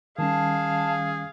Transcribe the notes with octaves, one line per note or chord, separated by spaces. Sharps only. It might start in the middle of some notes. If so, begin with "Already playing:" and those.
D#3 G3 C#4 G#4 F5 A5